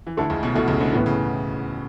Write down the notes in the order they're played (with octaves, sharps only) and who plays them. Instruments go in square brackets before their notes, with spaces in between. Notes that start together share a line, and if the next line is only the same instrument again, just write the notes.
[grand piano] E3
[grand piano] D2 D3 [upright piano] A3 E4 A4
[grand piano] C#2 C#3
B1 B2
[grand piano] B1 B2 [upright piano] A3 E4 A4
[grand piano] C#2 C#3
D2 D3
[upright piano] A2 E3 B3
[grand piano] C#3